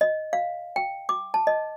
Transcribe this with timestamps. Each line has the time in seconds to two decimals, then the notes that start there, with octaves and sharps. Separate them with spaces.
0.01 D#5
0.33 F5
0.76 G5
1.09 D6
1.34 A5
1.47 D#5